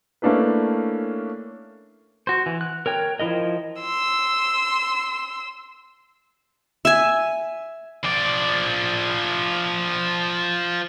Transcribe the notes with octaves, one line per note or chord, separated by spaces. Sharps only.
A3 A#3 C#4 D4 E4 B4
F#4 C5
E3
F#6
A#4 C#5 G5
F3 E4 A#4 D#5
C6 E6
E5 G#5
F3 D5